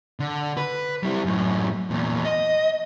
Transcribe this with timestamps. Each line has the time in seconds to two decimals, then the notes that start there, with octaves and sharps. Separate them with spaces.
0.20 D3
0.57 B4
1.03 G3 E4
1.25 F#2 A2
1.90 E2 A#2
2.25 D#5